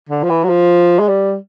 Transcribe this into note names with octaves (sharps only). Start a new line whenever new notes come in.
D3
F3
E3
F#3
F3
G#3
G3